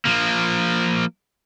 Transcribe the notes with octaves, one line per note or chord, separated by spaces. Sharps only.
F3 A#3